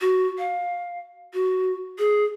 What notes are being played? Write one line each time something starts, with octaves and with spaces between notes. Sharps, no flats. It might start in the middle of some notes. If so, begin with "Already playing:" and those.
F#4
F5
F#4
G#4